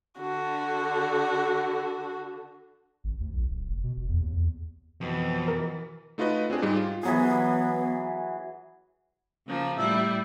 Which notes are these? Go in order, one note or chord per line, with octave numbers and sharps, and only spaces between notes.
D3 F#4
G#1
D2
B1
D1
F1
B2
E1
E2
D#2
E2
F2 B2 E3
A#4
A3 D#4 F4 F#4 B4 D#5
C4 D4 G#4
G#2 G3 D#4
F4
E3 F#3 B3 G#4
C#3 F3 A#3
A2 G3 E4 E5